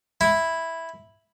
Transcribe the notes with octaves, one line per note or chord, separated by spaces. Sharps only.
E4